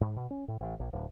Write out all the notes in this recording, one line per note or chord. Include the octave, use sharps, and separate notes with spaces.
G#2
B2
C#4
A2
A1
A#1
D1